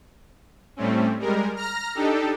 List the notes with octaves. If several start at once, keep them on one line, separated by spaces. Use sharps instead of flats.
A2 G3 A3 C4 C#4
G3 G#3 A#4
A#5 F6 A#6
D4 D#4 G4 A4